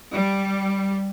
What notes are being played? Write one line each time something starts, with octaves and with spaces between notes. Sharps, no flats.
G3